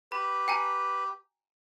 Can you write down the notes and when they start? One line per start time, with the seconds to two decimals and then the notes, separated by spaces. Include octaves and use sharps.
0.12 G4 B4 B5
0.48 G5 G#5 A#5